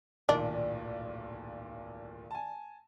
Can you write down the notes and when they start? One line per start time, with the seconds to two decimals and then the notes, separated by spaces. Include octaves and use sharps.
0.29 D1 B1 A#2 D#3 D4 D5
2.31 G#5 A5